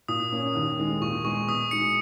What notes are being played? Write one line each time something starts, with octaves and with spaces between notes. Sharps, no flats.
A#2 D#6
A#3 C#4
D#2
D#3 G#3
A#2 C#6
G#3 B3 C#6
B2 D#6
G#3 D#4 C#7